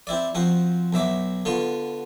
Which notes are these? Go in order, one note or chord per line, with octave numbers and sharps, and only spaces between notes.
C4 E4 D5
F3 C4 F#4
B1 F#3 E5 D6
D3 B3 F4 C#6